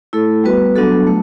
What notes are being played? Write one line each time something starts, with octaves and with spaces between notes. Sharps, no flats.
A3 E4 A4
G3 B3 F#4 B4
F#3 B3 D4 F#4 A4
A3